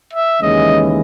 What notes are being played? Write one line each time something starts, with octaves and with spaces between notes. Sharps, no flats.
E5
D#2 C#3 E3 G#3 C#4 D#5